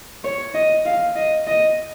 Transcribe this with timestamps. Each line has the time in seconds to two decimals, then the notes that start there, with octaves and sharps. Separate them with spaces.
0.24 C#5
0.54 D#5
0.86 F5
1.16 D#5
1.47 D#5